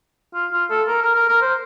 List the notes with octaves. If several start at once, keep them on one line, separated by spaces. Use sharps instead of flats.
F4
F4
A4
A#4
A#4
A#4
A#4
C5